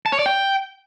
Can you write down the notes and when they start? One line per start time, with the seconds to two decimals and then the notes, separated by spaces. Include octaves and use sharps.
0.06 A5
0.12 C#5
0.19 D5
0.26 G5